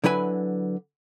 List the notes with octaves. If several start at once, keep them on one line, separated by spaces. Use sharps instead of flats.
D3 F#3 E4 B4 G#5